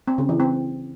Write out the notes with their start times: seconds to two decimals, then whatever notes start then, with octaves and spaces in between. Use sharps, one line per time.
0.08 C4
0.18 C#3
0.29 E3
0.40 C4